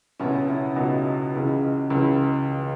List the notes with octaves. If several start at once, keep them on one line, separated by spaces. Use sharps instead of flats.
C#2 B2 C#4 E4
C#4 E4
C#2 B2 D#4 F#4
C#2 C#3 E3
C#2 C#3 E3